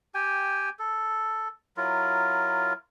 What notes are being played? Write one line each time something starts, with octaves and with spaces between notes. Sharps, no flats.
G4 G5 G#5
A4
F#3 E4 F4 A#4